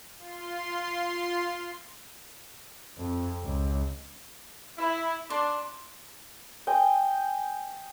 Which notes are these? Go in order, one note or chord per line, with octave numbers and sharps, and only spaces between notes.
F4 C6
F2
C#2
E4
D4 C6
D#5 G5 G#5